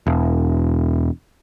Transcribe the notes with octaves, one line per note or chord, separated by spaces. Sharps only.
E1